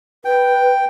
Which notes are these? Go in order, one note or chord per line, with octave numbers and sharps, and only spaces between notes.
B4 G5